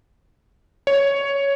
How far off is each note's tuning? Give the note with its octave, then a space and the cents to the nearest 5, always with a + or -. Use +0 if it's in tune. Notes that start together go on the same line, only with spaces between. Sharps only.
C#5 +5